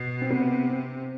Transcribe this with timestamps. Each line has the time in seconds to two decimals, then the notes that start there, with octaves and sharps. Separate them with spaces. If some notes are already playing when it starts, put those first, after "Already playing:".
Already playing: B2
0.21 C4
0.30 C3 B3
0.69 C4